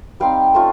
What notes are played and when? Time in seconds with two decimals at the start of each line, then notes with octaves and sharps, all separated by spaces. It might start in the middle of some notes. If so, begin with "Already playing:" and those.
0.20 G3 C4 D#4 F5 G5
0.54 A3 C#4 F4